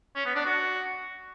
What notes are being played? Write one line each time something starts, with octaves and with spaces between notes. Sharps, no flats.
C#4
B3
D4
F#4